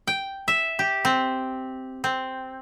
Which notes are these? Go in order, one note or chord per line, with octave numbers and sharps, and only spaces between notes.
G5
E5
G4
C4
C4